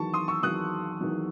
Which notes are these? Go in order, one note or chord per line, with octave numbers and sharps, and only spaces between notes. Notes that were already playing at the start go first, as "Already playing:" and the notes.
Already playing: E2 D#3 F#3 A5 C#6
C6 D#6
C#6 E6
E2 D#3 F#3 D#6 F#6
E2 D#3 F#3